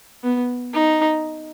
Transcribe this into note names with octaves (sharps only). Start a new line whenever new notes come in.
B3
D#4